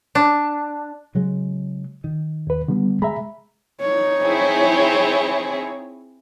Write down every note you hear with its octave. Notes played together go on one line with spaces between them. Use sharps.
D4
C#3 F#3 G#3
D#3
D#2 B4
D3 G3 B3
G#3 E5 A#5 B5
D#4 C#5
C4 E4 G#4